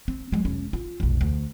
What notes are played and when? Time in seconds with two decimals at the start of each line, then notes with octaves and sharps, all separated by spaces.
0.08 C4
0.32 F#3 G#3
0.45 E1 C#4
0.73 F4
1.00 F1 B1
1.21 D2